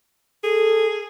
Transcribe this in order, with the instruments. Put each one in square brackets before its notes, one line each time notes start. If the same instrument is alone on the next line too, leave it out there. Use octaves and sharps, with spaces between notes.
[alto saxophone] G#4 [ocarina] A4